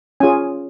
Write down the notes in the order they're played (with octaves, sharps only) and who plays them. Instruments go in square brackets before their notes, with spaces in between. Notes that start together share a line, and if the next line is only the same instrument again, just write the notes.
[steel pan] C#4 F4 G#4 G#5